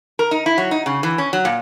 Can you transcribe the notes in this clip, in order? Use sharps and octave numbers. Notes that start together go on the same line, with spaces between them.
A#4
D#4
E4
F#3
D#4
C#3
E3
C#4
F#3
A#2